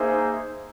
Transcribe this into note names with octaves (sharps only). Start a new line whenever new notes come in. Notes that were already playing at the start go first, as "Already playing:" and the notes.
Already playing: A#3 D#4 G#4 C5 E5